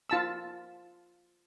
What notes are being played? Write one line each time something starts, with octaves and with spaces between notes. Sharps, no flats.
F4 A5 E6